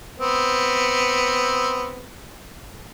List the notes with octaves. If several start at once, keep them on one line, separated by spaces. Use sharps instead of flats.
B3 C4